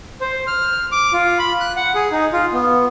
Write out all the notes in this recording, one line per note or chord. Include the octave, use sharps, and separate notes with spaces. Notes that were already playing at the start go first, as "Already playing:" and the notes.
C5
F6
D6
F4
B5
F#6
F#5
G#4
D#4
F4
B3